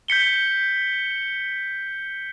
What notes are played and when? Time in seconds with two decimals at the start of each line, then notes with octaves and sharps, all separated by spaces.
0.08 G6 B6 C#7 G7